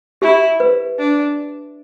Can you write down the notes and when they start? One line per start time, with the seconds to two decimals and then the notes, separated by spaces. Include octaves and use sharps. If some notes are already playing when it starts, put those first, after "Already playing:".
0.22 E4 G4
0.60 B4
0.99 D4